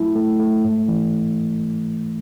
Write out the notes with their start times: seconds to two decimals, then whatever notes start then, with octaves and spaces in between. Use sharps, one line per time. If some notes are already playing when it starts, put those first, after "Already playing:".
Already playing: F#3 A3 E4
0.15 A3
0.40 A3
0.64 G#2
0.88 E3